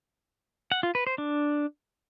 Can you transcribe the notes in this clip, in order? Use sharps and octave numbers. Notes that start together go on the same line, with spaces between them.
F#5
F4
B4
C5
D4